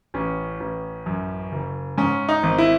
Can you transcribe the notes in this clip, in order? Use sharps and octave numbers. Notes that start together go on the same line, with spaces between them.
A1 C#4
A1
F#2
F#1
G#2 C#4
D#4
G#1
E4